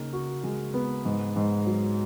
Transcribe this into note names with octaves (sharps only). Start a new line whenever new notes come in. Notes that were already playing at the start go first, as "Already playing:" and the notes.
Already playing: C#3 A#3 D#4
F#4
G#3
B3
G#2
G#2
F#3